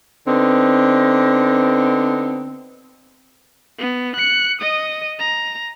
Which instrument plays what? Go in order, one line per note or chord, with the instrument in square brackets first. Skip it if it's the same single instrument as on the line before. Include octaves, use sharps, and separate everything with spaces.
[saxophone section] D3 B3 C4 D#4
[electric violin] B3
F#6 C#7
D#5 D#6
A#5